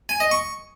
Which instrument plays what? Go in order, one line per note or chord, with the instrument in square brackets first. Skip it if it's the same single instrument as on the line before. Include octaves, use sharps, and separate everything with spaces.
[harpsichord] G#5
D#5
C#6